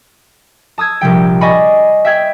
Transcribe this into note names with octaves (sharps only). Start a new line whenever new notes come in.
A5 D#6 E6 G#6
A#1 C3 G3 G5
D5 D#5 G#5 B5 C#6
E5 G5 E6 G#6 B6